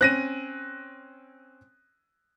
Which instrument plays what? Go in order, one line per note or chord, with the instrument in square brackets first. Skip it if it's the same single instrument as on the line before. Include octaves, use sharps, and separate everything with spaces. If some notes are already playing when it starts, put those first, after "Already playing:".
[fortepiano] C4 C#4 [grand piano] F#6 A#6 D#7